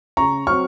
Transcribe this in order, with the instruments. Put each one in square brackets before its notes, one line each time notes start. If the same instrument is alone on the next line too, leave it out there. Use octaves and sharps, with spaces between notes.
[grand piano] C#3 A#5 C#6
F#3 C4 C#6 F6